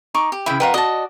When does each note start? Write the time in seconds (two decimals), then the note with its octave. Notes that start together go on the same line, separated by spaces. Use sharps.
0.14 D#4 C#6 D6
0.32 G4
0.46 C#3 E3 E4 G5
0.60 F2 F4 A#4 B4 F#5 G5
0.74 F#4 D5 D#5 A5